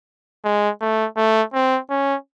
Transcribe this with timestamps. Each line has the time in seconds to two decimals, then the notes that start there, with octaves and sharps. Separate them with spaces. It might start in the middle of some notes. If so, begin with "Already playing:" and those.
0.44 G#3
0.81 A3
1.17 A3
1.54 C4
1.90 C#4